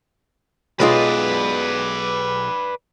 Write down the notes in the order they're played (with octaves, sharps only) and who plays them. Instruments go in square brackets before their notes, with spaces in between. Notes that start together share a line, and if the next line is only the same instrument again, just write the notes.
[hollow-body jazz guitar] B1 G#3 F4 [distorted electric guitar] B4 D5